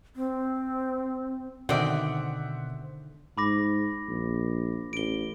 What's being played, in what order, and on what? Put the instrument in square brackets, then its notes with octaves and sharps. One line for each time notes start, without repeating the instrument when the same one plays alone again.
[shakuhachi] C4
[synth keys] B2 [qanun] D3 D#3 [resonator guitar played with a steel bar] C4 D5 [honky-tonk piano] E5 F#5
[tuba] G#2 [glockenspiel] B5 D6 A#6
[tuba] A#1
[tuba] A1 [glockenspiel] D7 G7